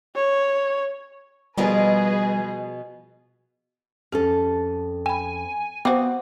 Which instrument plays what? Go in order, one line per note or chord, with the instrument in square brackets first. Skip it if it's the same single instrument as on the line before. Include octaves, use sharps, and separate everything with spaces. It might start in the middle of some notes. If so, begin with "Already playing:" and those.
[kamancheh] C#5
[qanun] B2 F3 A#4 [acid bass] G3 [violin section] G#4 B4 D#5 [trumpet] G#5
[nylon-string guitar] F2 C#4 A4 [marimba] G4
[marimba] G5 B5 [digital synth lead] G#5
[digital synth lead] B3 [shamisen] C4 F#4 [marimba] C5 F5 D6